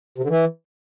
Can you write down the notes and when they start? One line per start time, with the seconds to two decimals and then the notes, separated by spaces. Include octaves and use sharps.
0.18 C3
0.24 D3
0.30 E3